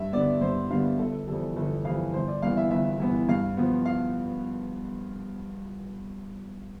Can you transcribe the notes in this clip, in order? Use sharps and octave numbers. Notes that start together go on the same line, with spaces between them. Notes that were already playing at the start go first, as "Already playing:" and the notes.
Already playing: G2 E5
D3 G3 B3 D5
G2 C5
D3 G3 B3 F5
G1 A4
F2 E3 G3 A4
G1 A4
F2 E3 G3 F5
G1 C5
D5
G2 E3 B3 F5
E5
G1 E5
G2 E3 B3
G2 F5
F3 B3
F5